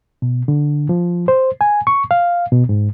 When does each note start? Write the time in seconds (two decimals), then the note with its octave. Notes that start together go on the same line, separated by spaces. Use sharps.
0.22 B2
0.48 D3
0.89 F3
1.28 C5
1.61 G#5
1.87 C#6
2.11 F5
2.52 B2
2.69 G#2